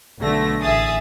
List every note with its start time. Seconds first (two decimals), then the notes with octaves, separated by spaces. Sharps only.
0.20 B1 D3 A3 A#6
0.60 A1 G#4 E5 D#6 A6